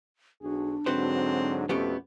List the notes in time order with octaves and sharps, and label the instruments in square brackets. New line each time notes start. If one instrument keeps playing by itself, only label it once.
[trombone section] B1 F#4 G#4 [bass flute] D4
[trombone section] G#2 D3 F#3 [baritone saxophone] C4 [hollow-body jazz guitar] F#4 B4 C5
[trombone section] F2 B2 A3 [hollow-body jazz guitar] B3 C#4 G4